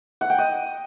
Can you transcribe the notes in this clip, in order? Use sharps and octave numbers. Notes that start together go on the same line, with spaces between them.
F#5
G5
D#5